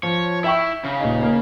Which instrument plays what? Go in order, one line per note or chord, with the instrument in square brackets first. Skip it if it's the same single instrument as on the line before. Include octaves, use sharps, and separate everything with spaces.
[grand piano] F3 [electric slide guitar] C#5
[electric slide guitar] E4 [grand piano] E5 G5 C#6
[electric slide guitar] C#3
[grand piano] D#1 D#4
A#3